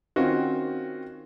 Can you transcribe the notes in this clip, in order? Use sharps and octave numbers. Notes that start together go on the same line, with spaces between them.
D#3 C4 C#4 F4 F#4